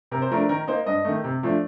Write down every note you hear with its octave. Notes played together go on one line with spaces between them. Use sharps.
C3 A#4
C5
F3 A3 D4 A#4
D#3 A#4
A#3 D#4 C5
G2 D#5
D#3 A3
C3
F3 A3 D4